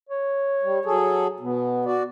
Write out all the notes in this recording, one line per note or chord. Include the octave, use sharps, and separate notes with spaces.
C#5
G3
F#3 G#4 A4
B2 B3
F#4 D5